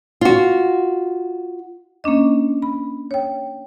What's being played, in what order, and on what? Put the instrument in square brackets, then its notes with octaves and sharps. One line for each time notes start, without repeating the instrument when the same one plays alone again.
[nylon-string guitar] F4 F#4
[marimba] A#3 C#4 D4 D#5
B5
C#5 G5